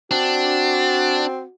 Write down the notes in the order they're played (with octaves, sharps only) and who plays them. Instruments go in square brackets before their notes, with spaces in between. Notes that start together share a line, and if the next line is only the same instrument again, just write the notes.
[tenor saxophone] C4 [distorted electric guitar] D4 [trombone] F#4